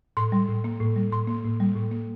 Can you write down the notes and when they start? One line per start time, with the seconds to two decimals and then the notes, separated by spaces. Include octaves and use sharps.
0.17 A2 C6
0.32 G3
0.48 A2
0.64 A#3
0.81 A2
0.96 G3
1.12 A2 C6
1.28 A#3
1.45 A2
1.60 G3
1.76 A2
1.92 A#3